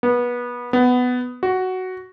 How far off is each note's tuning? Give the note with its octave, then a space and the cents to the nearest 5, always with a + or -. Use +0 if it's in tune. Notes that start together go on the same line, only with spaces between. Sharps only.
B3 -25
B3 +10
F#4 +5